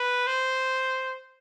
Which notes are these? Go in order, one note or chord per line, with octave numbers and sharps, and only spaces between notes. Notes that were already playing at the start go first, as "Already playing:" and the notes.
Already playing: B4
C5